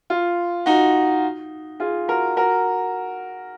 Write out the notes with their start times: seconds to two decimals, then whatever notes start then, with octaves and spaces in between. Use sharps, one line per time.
0.10 F4
0.66 D#4 F#4
1.80 F4 G#4
2.08 F#4 A#4
2.37 F#4 A#4